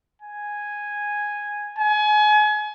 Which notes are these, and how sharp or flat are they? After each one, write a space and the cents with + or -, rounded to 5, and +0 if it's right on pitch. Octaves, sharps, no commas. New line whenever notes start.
G#5 -5
G#5 +30